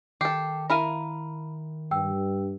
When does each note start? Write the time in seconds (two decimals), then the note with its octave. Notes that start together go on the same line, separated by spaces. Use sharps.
0.21 D#3 G4 A4 C7
0.70 E4 A#4 F5 B5 D#7
1.91 G2 G5 E6